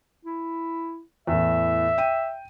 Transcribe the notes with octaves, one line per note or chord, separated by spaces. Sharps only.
E4
E2 A2 E5
G5 D#7